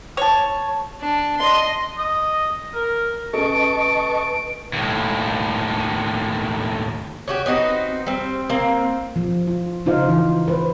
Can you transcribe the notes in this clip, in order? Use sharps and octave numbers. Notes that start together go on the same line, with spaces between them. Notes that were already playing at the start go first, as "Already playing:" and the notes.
C#5 A5
D4
D#5 C6
D#5
A#4
C#4 A4 B4 D#5 A5 C#6 D7
D#2 A2
C#4 F#4 G4
B3 C4 D#4 F#4
G3 C4
A#3 C4
F3
F4
C#3 D#4 F4 C5 F5
E3
B4 C5